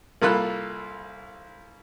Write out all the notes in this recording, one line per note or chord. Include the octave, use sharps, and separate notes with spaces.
C2 A#3 F4 A4 B5 F#6